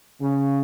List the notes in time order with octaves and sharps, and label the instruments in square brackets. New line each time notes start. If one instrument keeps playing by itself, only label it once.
[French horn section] C#3